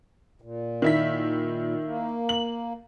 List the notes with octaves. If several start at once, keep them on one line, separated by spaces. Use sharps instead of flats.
A#2
D#3 E4 B6
A#3
F#7